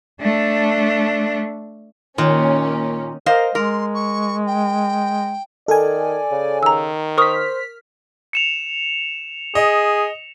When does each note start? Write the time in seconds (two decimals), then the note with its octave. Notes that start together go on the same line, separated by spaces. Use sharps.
0.21 A3 D4
2.18 A#2 D#3 A#3 C#4
3.26 A#4 C5 D#5 F5
3.55 G#3 A#4 C6
3.94 C#6
4.47 G5
5.68 D#3 A4 D5 G#5
6.31 C#3
6.63 D#3 A#5 E6
7.18 A#4 C5 C#6 D#6 F6 B6
8.33 C#7 E7 F7
9.55 G#4 D#5